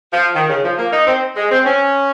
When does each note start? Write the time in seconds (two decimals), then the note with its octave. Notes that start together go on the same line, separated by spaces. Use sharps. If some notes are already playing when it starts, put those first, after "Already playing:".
0.13 F3
0.35 D#3
0.50 C#3
0.64 F3
0.78 A#3
0.93 D#4
1.07 C4
1.37 G#3
1.52 C4
1.66 C#4